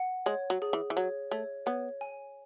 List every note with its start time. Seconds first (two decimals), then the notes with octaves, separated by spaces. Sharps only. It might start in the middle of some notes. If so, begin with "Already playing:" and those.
Already playing: F#5
0.26 G#3 C#5
0.50 F#3
0.62 G#4
0.73 E3
0.90 E3
0.97 F#3 C#5
1.31 A3 C#5
1.66 B3 C#5
2.01 G#5